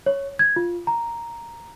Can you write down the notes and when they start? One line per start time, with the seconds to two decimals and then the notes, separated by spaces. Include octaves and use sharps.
0.06 C#5
0.39 G#6
0.56 F4
0.87 A#5